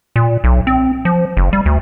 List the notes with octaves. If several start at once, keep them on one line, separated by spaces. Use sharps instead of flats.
A#2
B1
C4
F3
F#1
G3
D2